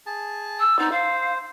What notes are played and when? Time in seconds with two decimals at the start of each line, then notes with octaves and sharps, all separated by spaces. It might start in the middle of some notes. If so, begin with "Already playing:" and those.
0.06 G#4 A5
0.59 E6
0.78 B3 C4 D#4 D5
0.91 C5 F5